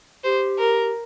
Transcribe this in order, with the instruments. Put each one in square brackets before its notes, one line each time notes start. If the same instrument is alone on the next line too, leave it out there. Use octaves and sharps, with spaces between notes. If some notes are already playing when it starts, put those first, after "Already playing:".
[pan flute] G4 [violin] C5
[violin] A#4